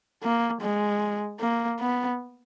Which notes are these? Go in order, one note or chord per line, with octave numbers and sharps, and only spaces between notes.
A#3
G#3
A#3
B3